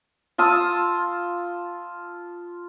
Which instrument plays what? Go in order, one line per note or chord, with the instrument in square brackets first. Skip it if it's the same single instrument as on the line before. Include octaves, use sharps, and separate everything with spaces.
[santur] F4 A5 D#6 E6